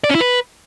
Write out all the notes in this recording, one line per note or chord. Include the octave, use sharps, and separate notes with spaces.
D5
C#4
E4
B4